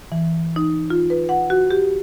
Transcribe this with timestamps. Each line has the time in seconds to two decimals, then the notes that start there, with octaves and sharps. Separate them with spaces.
0.12 E3
0.56 D#4
0.90 F4
1.10 B4
1.29 F#5
1.50 F#4
1.71 G4